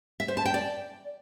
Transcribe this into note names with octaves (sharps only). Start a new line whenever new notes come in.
E5
C5
A5
G5
D5